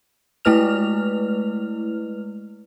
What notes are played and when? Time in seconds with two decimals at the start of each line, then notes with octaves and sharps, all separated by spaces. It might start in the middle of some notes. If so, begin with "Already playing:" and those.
0.45 G#3 A3 E4 B4 F6 F7